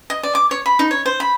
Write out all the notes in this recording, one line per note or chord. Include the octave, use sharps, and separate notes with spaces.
D#5
D5
D6
C#5
B5
D#4
C#5
C5
B5